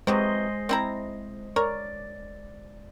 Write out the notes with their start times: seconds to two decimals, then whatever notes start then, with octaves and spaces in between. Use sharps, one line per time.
0.07 C3 E3 F#3 G#3 C5 D#5
0.69 C4 E4 A#5
1.56 A#4 C#5 D5